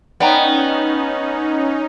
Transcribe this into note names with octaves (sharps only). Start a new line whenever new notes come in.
B3 C#4 D#4 D5 G5 A#5